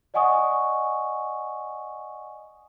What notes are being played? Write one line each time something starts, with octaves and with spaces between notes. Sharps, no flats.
D5 D#5 F#5 G#5 C#6 D#6